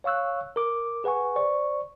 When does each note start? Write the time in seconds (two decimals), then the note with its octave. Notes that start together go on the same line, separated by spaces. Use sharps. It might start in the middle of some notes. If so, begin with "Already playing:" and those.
0.04 C#5 F5 C#6 E6 F#6
0.56 A#4 D6
1.04 G#4 B4 F#5 G#5 C#6
1.36 C5 D5 C#6